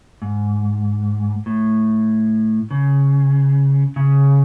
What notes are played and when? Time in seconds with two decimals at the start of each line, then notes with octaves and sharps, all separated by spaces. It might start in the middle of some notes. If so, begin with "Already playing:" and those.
0.22 G#2
1.46 A2
2.71 C#3
3.96 C#3